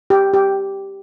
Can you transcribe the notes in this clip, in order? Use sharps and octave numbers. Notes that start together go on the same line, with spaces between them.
G4
G4